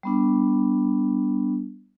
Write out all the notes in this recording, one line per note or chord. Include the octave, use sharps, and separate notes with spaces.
G3 B3 D4